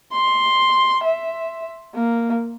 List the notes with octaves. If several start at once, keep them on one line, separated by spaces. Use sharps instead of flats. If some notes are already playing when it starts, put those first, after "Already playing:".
C6
E5
A#3